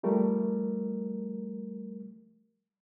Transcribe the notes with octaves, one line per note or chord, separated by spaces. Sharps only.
F3 G3 A3 A#4